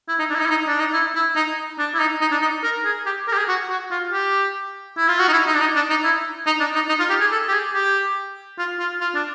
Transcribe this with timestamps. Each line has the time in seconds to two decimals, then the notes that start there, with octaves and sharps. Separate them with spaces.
0.09 E4
0.19 D#4
0.30 D4
0.35 E4
0.40 D#4
0.46 E4
0.51 D#4
0.67 D4
0.79 D#4
0.93 E4
1.15 E4
1.36 D#4
1.79 D4
1.94 E4
2.00 D#4
2.21 D#4
2.32 D4
2.42 D#4
2.63 A#4
2.85 G#4
3.06 G4
3.28 A#4
3.33 G4
3.38 G#4
3.48 F#4
3.70 F#4
3.91 F4
4.12 G4
4.97 E4
5.08 F4
5.19 F#4
5.28 D#4
5.33 E4
5.47 D#4
5.54 D4
5.61 D#4
5.76 D4
5.90 D#4
6.04 E4
6.46 D#4
6.60 D4
6.75 D#4
6.89 D#4
6.99 F4
7.10 G4
7.20 G#4
7.31 A4
7.48 G4
7.52 G#4
7.73 G4
8.58 F4
8.80 F4
9.01 F4
9.15 D4